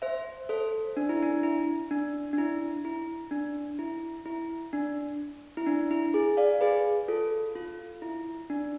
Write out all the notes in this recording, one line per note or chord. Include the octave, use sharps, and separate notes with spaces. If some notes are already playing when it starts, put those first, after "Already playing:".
C5 E5
A4 C5
D4
E4
D4
E4
D4
D4
E4
E4
D4
E4
E4
D4
E4
D4
E4
G#4
D5 F5
G#4 B4
F4 A4
F4
E4
D4